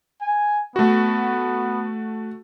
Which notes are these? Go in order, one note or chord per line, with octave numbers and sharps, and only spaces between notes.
G#5
A3 B3 F#4